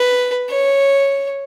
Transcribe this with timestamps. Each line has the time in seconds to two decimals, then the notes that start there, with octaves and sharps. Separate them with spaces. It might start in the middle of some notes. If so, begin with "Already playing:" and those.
Already playing: B4
0.50 C#5